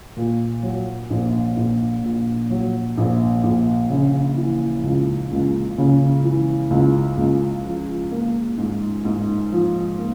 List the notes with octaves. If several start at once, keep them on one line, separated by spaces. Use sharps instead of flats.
A#2
F#3
A#1
A#1
A#2
F#3
A#1
A#1
C#3
E3
C#2
C#2
C#3
E3
C#2
C#2
F3
A#3
G#2
G#2
F3
A#3